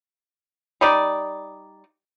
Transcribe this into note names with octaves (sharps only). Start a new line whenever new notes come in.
G3 D#4 D5